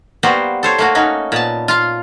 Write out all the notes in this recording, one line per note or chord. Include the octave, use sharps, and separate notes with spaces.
G3 A#3 B3 F#4 C5
A4 C5 C#5
A3 A#3 F#4
C#4 D#4 F#4
A#2 B3 A5
F4 F5